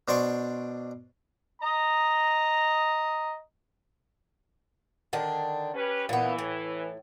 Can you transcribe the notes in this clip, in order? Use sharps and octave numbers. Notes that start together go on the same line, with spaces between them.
B2 D4 C5 D5 C#6 D6
D#5 A#5
D3 D#3 D4
C#4 G4 B4
A#2 E3 B3
A2